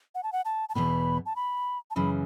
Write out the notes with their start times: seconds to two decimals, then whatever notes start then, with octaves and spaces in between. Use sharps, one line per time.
0.15 F#5
0.23 A5
0.33 F#5
0.45 A5
0.69 A5
0.75 E2 B2 B3 B5
1.26 A5
1.36 B5
1.91 A5
1.96 F#2 C#3 E3 B5